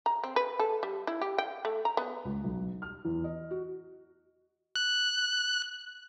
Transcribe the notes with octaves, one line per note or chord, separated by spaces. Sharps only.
A#5
C4
B4
A4
G3
E4
G4
G5
A3
A#5
B3
C#2
B1
F6
E2
D#5
F#4
F#6